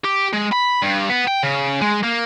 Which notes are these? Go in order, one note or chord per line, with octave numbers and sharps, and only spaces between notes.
G4
G#3
B5
G2
B3
G5
C#3
G#3
A#3